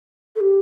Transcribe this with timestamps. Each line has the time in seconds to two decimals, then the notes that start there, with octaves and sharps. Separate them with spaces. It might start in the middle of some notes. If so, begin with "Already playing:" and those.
0.36 A4
0.40 G4